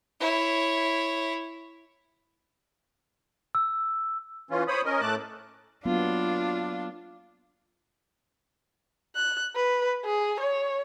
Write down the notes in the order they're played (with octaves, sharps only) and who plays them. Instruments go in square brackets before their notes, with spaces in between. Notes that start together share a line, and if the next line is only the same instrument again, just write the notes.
[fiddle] E4 C#5
[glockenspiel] E6
[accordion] E3 C#4 F4
C5 C#5 B5 D#6
C#4 A#4 D#5
A2 A3 A5 D6 F#6
[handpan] F#3 A#3 B3 [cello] D4 [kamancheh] F4
[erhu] F#6
B4
G#4
C#5